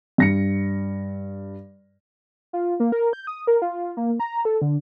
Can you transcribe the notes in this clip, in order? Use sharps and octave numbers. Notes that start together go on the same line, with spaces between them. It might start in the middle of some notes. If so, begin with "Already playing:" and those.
G2 A#6 C#7
F4
A#3
A#4
G6
D#6
A#4
F4
A#3
A#5
A4
D3